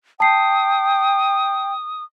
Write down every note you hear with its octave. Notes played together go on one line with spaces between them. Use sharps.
G5 A5 D#6 C7